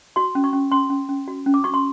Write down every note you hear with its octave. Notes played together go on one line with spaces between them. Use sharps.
F#4 C6
C#4
C#6
C#4
C#4 C6
C#4
C#4
F#4
C#4
D6
F#4 C#6
C6